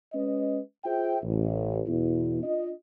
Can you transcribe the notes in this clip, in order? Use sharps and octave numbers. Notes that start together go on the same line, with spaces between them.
G#3 C#4 B4 D#5
F4 G#4 C5 E5 G5
A1
E2 B2 E4
D4 F4 D#5